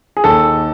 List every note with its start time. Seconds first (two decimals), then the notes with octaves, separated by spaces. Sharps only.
0.17 G#4
0.24 D#2 A4